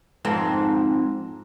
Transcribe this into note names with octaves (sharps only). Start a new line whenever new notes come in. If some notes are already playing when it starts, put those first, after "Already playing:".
F2 G#2 C4